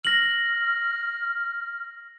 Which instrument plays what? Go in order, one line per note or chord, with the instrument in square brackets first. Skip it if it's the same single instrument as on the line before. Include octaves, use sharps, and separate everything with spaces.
[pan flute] F6 [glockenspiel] A#6 F#7